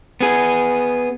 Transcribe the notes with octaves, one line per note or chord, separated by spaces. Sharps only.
B3 G#4